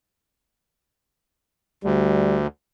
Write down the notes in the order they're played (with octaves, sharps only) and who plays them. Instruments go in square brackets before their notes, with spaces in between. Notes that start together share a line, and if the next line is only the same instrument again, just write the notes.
[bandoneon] D2 [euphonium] G3